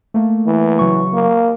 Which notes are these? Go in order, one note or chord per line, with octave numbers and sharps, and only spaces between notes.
A3 A#3
E3
C#3 F#3 C#6
A#3